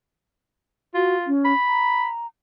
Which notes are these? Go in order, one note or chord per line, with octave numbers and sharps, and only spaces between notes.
F4 F#4
C#4
B5
A#5